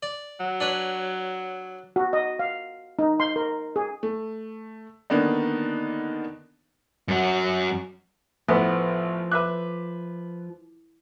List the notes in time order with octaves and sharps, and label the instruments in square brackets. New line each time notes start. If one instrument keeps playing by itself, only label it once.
[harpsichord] D5
[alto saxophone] F#3
[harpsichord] D4 B4 C#5
[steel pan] F#4
D#5
F5
D#4
C6
A#4
G#4
[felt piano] A3
D3 D#3 A#3 B3 D4 D#4
[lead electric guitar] F#2 F#3
[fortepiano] A1 B3 [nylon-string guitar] F3 [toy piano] A4 B4 D#6
[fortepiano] B4 E5 F#6 [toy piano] D6